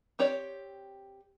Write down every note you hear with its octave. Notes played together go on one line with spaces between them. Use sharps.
C4 G4 C#5 D5